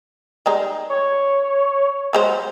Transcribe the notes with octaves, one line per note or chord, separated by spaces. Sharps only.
G3 G#3 D#4
C#5
F#3 G#3 C5